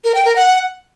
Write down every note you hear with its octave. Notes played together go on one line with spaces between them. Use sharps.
A#4
G5
A#4
F#5